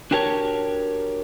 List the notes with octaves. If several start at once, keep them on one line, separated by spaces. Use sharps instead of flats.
D4 F#4 G4 A#4 C#5 A5